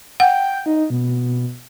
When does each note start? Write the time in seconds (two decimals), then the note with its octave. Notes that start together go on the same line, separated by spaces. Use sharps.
0.20 F#5 G5
0.66 D#4
0.90 B2